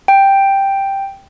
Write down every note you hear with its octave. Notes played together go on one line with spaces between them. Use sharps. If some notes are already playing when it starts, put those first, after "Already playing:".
G5